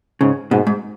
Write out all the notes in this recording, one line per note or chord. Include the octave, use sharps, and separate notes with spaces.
G#2 C#3
G#2 B2
G#2